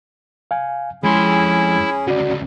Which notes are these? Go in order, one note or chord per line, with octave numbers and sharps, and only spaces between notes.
F5 G#5
F2 G#3 C#4 E4 G#4 C6
D2 C#3 F#4 D5